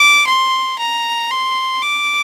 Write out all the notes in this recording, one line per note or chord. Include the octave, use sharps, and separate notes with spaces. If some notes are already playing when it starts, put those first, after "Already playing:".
Already playing: D6
C6
A#5
C6
D6